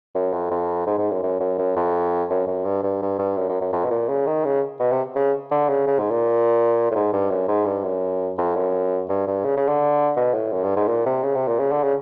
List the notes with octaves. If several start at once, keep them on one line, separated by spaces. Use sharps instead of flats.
F#2
F2
F2
G#2
G#2
F#2
F#2
F#2
F#2
F2
F#2
F#2
G2
G2
G2
G2
F#2
F#2
F#2
F2
B2
A#2
C#3
D#3
C#3
B2
C3
C#3
D3
C#3
C#3
G#2
A#2
A2
G#2
G2
F#2
G#2
G2
F#2
F2
F#2
G2
G2
C#3
C#3
D3
B2
A2
F#2
G2
G#2
A#2
C3
C#3
C3
A#2
C#3
D3
C#3